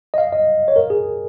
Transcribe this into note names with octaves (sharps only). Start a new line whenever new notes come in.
D#5
F5
D#5
C#5
A#4
G#4